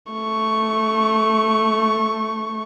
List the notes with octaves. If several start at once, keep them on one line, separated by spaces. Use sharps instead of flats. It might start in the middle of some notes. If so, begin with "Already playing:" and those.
A3 C#6